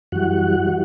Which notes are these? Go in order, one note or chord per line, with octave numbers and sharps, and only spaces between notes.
F#2 E3 G3 F#4 F#5
E3 G3